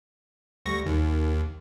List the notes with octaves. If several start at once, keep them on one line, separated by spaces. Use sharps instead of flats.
D2 G3 C#6 A#6
D#2 D#3